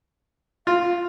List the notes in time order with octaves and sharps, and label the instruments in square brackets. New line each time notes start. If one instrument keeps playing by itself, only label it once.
[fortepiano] F4 [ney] F5